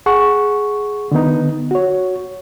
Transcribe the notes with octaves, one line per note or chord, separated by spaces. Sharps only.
G#4 F#5 C#6
D3 D#3 B3 D#4
F#4 C#5